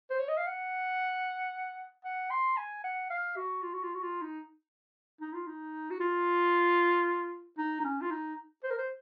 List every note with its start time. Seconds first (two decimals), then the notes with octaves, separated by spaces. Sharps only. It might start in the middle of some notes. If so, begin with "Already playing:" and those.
0.10 C5
0.19 C#5
0.28 D#5
0.37 F5
0.47 F#5
2.05 F#5
2.31 C6
2.57 G#5
2.84 F#5
3.10 F5
3.36 F#4
3.62 F4
3.73 F#4
3.83 F4
3.94 F#4
4.02 F4
4.22 D#4
5.21 D#4
5.34 F4
5.47 D#4
5.90 F#4
6.00 F4
7.58 D#4
7.80 D#4
7.84 C#4
8.01 F4
8.11 D#4
8.63 C5
8.70 A#4
8.78 C5